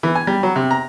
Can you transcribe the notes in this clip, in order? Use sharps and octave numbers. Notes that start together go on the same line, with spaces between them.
E3
G#5
G3
F#3
C3
A#5